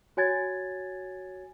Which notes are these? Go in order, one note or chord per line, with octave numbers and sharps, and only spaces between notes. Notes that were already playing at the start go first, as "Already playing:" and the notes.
F#4 C#5 G#5 G#6 A6